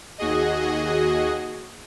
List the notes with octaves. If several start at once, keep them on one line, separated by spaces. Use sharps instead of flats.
D#2 F#4 G#4 D#5